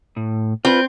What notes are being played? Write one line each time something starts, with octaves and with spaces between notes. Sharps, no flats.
A2
C4 F4 B4